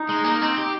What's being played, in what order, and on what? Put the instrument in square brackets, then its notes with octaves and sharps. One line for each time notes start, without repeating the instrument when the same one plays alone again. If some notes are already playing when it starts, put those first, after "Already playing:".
Already playing: [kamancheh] D#4
[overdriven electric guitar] G#3
A#3
C4
G4